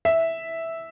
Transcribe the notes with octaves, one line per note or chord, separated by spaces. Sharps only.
E5